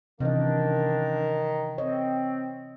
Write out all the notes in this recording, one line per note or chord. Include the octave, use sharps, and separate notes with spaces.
C3 D#3 E3 A#3 C#4 D4 D#5
C4 C#5 D#5